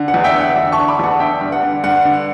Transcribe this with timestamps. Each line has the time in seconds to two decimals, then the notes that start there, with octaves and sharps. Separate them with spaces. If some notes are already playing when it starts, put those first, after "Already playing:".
Already playing: D3
0.08 F#5
0.14 E2
0.24 E5 G5
0.35 D3
0.40 F#5
0.56 E2 E5
0.72 A5 C#6
0.78 D3
0.88 B5 D6
0.99 E2 F#5 A5
1.20 D3 E5 G5
1.41 G2
1.52 F#5
1.63 D3
1.84 G2 F#5
2.05 D3